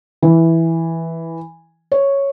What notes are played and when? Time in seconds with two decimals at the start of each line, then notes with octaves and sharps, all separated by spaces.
0.22 E3
1.92 C#5